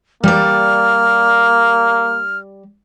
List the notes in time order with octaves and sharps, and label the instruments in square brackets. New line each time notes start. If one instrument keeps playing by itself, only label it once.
[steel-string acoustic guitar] G3 D5 [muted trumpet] A#3 [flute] F6